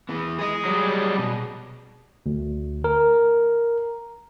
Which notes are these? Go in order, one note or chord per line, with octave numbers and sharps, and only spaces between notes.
E3 B3
G#4 D#5
F#3 G3
B2
D2
A#4